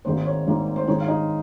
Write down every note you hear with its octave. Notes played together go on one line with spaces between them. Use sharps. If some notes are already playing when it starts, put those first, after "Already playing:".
G#1 G#2 D#3 A#3 C5
C#5
G#1 G#2 D#3 A#3
C5
G#2 D#3 G#3 D#4 C#5
F5
D#4 D#5